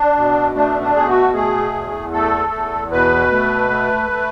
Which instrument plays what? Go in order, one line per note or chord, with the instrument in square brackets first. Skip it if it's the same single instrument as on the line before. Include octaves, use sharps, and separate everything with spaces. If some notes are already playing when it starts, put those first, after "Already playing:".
Already playing: [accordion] D4
B2
A3 D4
D4
B2 G#4
F#4
A3 G#4
E2
A3 A4
E2
B2 B4
A3
A3
A3